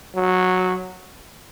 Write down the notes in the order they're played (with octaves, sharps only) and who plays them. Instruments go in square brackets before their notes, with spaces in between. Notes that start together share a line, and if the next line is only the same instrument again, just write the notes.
[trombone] F#3